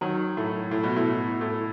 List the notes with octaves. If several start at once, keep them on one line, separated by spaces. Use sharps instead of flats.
D#3 F#3
A2
A2
B2
A2
A2